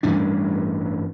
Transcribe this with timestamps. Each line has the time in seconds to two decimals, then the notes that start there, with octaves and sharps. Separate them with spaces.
0.03 A1 G2 C#4 D4